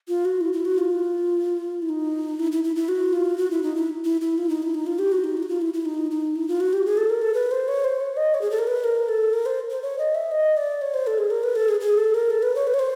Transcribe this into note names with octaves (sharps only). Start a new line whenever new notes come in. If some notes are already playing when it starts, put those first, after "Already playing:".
F4
F#4
E4
E4
F#4
F4
E4
D#4
E4
E4
E4
E4
F#4
F4
F#4
E4
D#4
E4
E4
E4
F4
D#4
E4
D#4
F4
G4
F#4
D#4
E4
F#4
F4
E4
E4
D#4
D#4
E4
F4
F#4
G4
G#4
A4
A#4
A4
B4
C5
C#5
C5
C#5
D#5
C#5
G#4
A4
A#4
B4
A#4
A4
A#4
C5
C5
C#5
D#5
E5
D#5
D5
C#5
C5
A4
G#4
A#4
B4
A4
G#4
G#4
A4
A#4
A4
B4
C#5
B4
C#5
C5